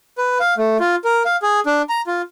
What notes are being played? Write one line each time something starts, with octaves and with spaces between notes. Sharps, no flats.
B4
F5
A3
F4
A#4
F5
G#4
D4
A#5
F4